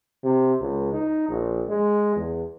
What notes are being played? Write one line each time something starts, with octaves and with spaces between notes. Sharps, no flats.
C3
C#2
D#4
A#1
G#3
E2